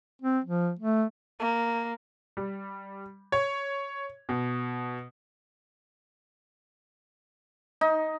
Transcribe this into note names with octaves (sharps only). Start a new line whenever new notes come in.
C4
F3
A3
A#3
G3
C#5
B2
D#4